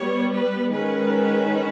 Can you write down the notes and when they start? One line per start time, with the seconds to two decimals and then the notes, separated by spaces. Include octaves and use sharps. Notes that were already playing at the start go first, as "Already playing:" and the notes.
Already playing: G3 B3 C#5
0.34 B4
0.71 D#3 G#3 C#4 B4